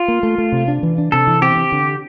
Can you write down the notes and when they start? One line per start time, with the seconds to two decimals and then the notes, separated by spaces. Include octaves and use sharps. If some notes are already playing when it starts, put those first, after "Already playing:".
Already playing: F4
0.08 A#3
0.23 A3
0.38 A3
0.52 C3
0.68 D4
0.83 E3
0.98 D4
1.12 C3 A4
1.27 E3
1.42 C4 G4
1.57 C4
1.72 D3